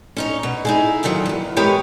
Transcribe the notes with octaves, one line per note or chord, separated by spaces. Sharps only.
C#4 D#4 C#5
B2
D#4 E4 G#4
F2 A#2 D3 D#3 F#3
E2 G2
G#3 B3 G4 A#4 B4 C#5